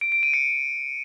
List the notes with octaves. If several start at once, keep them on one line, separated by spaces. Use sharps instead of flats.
D7
D7
D#7
C#7